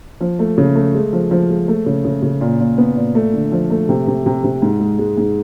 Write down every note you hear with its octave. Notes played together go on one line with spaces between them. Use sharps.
F3
A3
C#3
A3
G#3
F3
F3
G#3
A3
C#3
C#3
C#3
A#2
A#2
B3
A#2
A3
D3
F3
A3
C3
C3
C3
C3
G#2
G#3
G#3
G#2